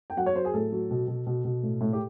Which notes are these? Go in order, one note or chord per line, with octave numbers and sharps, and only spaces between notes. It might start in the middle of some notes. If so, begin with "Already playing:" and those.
G5
F#3 F#5
C#5
F#3 C5
G#4
A2 A4
F#3
B2
B2
B2
B2
A2
A2
G4